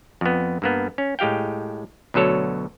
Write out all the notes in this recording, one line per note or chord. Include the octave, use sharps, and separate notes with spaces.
F2 B3
G2 A#3 B3
C#4
A2 G#3 G4 F5 G5
D2 B2 F#3 A4 C#5